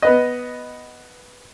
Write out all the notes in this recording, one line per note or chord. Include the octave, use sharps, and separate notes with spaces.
B3 B4 D#5